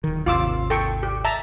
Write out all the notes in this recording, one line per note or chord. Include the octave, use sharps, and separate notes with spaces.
D1 D#3
G#1 D#2 C3 F4 D6 E6
A4 G5 C#6
G4
E5 A5 A#5